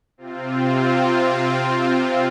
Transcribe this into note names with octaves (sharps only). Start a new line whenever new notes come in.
C3 C4 F4